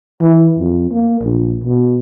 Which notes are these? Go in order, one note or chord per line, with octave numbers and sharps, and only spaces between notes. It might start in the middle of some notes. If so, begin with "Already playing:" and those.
E3
F2
A#3
A#1
B2